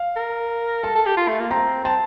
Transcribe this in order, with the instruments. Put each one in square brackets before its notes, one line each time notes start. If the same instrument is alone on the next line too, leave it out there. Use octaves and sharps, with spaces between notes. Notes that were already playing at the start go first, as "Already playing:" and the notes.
Already playing: [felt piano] F5
[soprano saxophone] A#4
[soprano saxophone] A4 [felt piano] A5
[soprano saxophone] A4
G4
F4
A3
A#3
[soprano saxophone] C4 [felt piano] A#5
[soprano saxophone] C4 [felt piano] A5